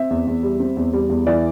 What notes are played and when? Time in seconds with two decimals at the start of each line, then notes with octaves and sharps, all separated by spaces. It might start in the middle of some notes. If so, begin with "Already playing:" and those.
Already playing: C4 E5
0.10 E2
0.27 E2
0.43 G3
0.60 C4
0.77 E2
0.93 G3
1.09 E2
1.27 E3 D5